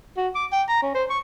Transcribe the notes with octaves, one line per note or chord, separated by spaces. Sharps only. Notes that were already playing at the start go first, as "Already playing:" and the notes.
F#4
D6
G5
A#5
C#4
C5
C#6